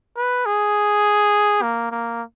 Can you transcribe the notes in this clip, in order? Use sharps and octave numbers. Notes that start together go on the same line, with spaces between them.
B4
G#4
A#3
A#3